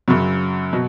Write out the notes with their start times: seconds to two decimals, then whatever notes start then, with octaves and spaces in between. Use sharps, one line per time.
0.08 F#2 C#3 F#3
0.73 B2 F#3